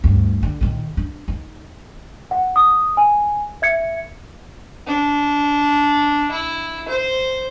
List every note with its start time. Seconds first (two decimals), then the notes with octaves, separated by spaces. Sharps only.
0.04 D2 G2
0.43 D3
0.61 A#2 D#3
0.97 D4
1.28 D#4
2.31 F#5
2.56 D#6
2.97 G#5
3.62 E5 G#6 C#7
4.87 D4
6.32 E4
6.88 C5